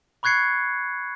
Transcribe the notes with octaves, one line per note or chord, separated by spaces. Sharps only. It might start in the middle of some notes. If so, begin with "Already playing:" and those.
B5 C#6 F#6 G#6 C7 C#7